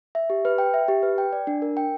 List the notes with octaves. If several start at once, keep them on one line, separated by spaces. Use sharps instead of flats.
E5
G4
B4
G5
E5
G4
B4
G5
D5
D4
A#4
G5